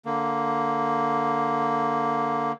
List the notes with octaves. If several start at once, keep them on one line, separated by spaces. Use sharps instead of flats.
D3 A#3